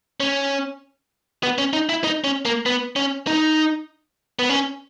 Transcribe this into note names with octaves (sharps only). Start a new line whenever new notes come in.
C#4
B3
C#4
D#4
E4
D#4
C#4
A#3
B3
C#4
D#4
B3
C#4